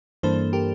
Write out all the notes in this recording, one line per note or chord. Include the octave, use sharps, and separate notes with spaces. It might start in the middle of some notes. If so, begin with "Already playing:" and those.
G2 E3 A#3 D4 A4 C5
G4 A#4